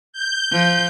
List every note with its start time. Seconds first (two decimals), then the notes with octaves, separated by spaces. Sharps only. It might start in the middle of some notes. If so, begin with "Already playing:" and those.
0.13 G6
0.52 F3